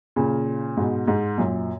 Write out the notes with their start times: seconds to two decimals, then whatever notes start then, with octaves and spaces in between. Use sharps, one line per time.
0.16 A#2 C#3
0.77 G#2 B2
1.08 G#2
1.38 F#2 A#2